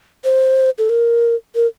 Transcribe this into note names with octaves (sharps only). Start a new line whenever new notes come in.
C5
A4
A#4
A#4